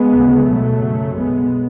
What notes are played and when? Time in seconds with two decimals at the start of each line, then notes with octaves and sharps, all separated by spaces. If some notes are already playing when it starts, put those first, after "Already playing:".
Already playing: G#3 B3
0.13 D2 C#3
0.46 B1 B2 F#3 A3
0.81 F#1 F#2 C#3
1.15 B1 B2 G#3 B3